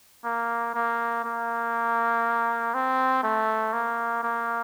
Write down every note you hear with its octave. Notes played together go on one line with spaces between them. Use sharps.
A#3
A#3
A#3
C4
A3
A#3
A#3